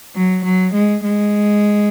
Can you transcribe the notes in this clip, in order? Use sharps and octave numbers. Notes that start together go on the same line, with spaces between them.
F#3
F#3
G#3
G#3